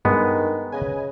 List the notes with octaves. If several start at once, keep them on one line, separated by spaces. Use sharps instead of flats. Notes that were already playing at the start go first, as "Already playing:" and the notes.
G2 D#3 G#3 B3
C#3 B4 D#5 G#5